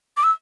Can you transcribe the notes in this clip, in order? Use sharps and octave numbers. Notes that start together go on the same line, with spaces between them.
D6
E6